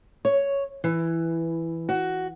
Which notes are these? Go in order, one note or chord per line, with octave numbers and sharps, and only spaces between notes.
C#5
E3
F#4